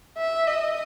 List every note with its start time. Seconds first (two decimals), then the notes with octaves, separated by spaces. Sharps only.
0.18 E5
0.47 D#5